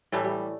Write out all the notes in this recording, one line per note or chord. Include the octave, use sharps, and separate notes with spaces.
A2 E3 G3 A3
G3